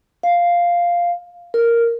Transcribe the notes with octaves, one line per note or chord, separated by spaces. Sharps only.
F5
A#4